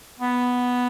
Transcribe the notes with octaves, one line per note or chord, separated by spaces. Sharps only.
B3